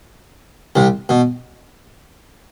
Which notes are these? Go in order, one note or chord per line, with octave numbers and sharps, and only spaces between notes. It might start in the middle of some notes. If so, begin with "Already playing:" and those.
C2 C3
B2